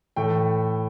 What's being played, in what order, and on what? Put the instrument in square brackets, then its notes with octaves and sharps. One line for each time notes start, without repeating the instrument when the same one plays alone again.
[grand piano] A2 E3 A3 G5